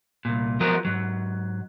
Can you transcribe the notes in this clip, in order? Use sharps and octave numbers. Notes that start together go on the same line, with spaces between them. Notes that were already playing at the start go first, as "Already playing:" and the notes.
C2 A#2
F3 F#3 G#3 B3 F#4 A#4
G#2 F#3